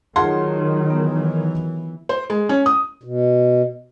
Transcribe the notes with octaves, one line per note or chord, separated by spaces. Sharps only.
D#3 F#3 F4 G#4 F#5 A5 C6
E3 B3
C5
G#3
C#4
D#6
B2